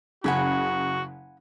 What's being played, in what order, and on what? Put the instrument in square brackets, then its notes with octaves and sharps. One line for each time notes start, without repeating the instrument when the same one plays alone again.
[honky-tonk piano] F#1 C#3 [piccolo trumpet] F#4 [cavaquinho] F#5 G#5 B5